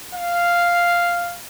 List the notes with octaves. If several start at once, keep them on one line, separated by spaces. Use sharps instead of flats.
F5